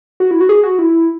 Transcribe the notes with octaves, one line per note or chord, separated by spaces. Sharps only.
F#4
E4
F#4
G#4
F#4
E4